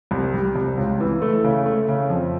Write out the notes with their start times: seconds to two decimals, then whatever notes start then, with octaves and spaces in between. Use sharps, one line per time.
0.11 C2
0.34 G3
0.55 C2
0.77 C#2
1.00 E3
1.22 A3
1.44 C#3
1.66 A3
1.88 C#3
2.10 F2